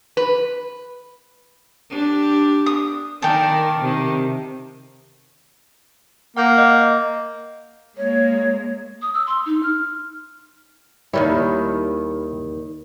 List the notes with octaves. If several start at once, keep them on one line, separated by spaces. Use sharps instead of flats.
B4
D4 G4
D#6
D#3 A4 A#4 D5 G5
C3 D#3
A#3 F#5 F6 G6
D#5
G#3 A#3 C#5
D#6
E6
C6
D#4
F6
D#2 D#3 G3 E4 C#5